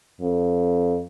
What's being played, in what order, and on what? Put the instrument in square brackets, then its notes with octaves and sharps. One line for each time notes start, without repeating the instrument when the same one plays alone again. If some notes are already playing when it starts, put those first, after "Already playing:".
[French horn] F2